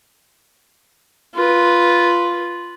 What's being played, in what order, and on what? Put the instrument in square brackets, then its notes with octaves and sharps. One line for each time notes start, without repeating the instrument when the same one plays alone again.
[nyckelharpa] F4 B4